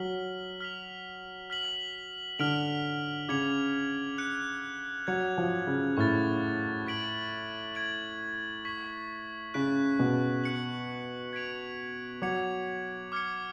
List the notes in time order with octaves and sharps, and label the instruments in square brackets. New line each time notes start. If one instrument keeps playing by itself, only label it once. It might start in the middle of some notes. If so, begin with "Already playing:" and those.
Already playing: [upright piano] F#3 [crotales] F6 B6 F#7
[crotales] F6 B6 F7
F6 B6 F#7
[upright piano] D3 [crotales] F6 B6 D7 F7
[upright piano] C#3 [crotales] D6 G#6 C#7 F7
[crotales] F#6 C#7 F7
[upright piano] F#3 [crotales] G#6 C#7 F7
[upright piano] F3
C#3
[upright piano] A2 [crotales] C#6 F6 A6
[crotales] C#6 G#6 B6 D7 F#7
G#6 D7 F#7
C#6 G#6 B6
[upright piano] C#3 [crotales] C#6 F#6 B6 D7
[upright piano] B2
[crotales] F#6 C#7 F#7
G#6 B6 D7 F7
[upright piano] F#3 [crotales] D6 G#6 C#7 F7
[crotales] D6 F6 G#6 C#7